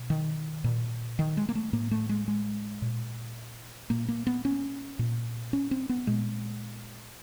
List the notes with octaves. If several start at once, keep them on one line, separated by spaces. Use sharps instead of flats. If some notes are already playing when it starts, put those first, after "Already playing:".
Already playing: B2
D#3
A#2
D#3
G#3
A#3
A3
A2 A#3
A3
G#3
G#3
A#2
A#2 A#3
A#3
B3
C#4
A#2
C#4
C4
B3
A#2 G#3